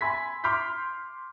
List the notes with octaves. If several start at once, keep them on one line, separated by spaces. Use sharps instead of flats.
G#5 B5 C6 E6 G#6 B6
C6 D6 F6 G6 B6